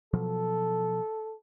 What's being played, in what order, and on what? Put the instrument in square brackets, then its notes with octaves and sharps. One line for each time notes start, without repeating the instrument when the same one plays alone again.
[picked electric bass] B2 F3 F#3 [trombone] A4